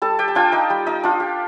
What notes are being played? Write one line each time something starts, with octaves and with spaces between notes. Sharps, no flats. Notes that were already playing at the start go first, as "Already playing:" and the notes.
G3 A4 A5
G4 G5
A5
D4 F4 G4 G5
D#4 D#5
G3
D#4 D#5
D4 F4
G4